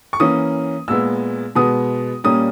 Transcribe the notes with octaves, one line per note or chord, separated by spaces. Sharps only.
C#6
E3 A#3 C#4 D#6
A#2 G#3 B3 E6
B2 G#3 B3 D#6
A#2 G3 A#3 C#4 D#6